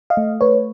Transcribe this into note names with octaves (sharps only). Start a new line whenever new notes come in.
D#5 F5
A3
A3 B4 C#5